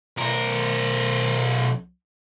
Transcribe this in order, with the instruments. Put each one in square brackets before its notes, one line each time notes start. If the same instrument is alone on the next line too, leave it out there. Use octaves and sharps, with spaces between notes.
[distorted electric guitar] B1 A#4